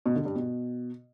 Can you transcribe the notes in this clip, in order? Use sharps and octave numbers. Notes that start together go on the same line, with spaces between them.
B2
D3
G2
B2